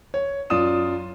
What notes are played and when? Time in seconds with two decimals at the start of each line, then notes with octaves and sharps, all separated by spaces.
0.14 C#5
0.50 F#2 F4 D5 D#6 E7